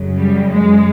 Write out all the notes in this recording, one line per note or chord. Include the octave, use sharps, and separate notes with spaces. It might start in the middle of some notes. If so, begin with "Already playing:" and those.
Already playing: F#2 C#3 F#3
G3
G#3